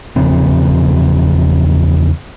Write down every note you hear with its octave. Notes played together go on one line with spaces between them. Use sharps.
E2 C#3 F3 C4